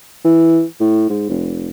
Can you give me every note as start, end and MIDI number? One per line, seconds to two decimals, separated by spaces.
0.25 0.63 52
0.80 1.06 45
1.10 1.25 44
1.30 1.69 29